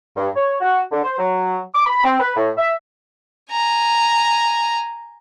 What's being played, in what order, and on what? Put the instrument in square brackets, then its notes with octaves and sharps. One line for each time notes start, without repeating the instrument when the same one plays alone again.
[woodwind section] G2
C#5
F#4
D3
C5
F#3
D6
B5
C4
B4
A2
E5
[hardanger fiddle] G#5 A#5